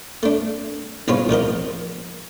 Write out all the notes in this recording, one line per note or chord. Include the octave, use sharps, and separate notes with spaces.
A3 D4
C2 G#2 G#3 B3 F4 C#5
A1 F3 A#4 D#5